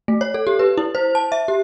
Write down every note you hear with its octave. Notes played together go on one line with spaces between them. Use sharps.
A3
C#5
A4
G4
B4
E4
C5
A5
E5
G4